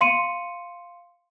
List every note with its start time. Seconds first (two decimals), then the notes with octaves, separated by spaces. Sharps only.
0.01 F5 C6 C#7 D#7